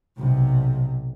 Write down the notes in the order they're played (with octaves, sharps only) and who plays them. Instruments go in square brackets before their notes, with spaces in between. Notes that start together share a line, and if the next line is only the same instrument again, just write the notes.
[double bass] B1 C3